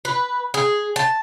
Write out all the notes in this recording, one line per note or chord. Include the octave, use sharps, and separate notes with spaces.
B4
G#4
A5